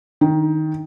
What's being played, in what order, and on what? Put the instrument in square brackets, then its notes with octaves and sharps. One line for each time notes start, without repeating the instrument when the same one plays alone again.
[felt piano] D#3